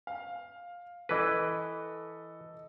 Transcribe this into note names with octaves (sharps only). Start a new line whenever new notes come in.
F5
E3 A4 B4 D#5